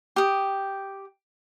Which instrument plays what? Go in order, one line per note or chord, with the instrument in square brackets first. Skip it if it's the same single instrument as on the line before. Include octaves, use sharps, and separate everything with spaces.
[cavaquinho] G4 D#6